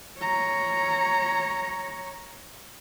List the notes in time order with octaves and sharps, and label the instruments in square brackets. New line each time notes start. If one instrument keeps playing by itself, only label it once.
[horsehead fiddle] C#5 A#5